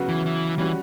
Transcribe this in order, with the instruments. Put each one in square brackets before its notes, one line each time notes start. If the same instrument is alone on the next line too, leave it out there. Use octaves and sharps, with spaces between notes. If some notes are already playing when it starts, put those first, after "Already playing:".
Already playing: [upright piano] C#3 F#3 B3 F#4
[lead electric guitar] E3
E3
[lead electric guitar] E3 [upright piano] G3 C#4 F#4